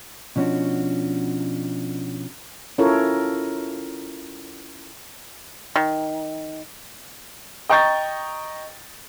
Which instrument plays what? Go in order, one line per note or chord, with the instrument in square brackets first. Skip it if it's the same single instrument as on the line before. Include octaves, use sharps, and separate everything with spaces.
[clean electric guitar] B2 F3 C#4 D4 F#4
[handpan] C#4 E4 F4 A4 A#4 C#5
[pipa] D#3
[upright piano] D#5 G5 A#5 C#6 G6 A6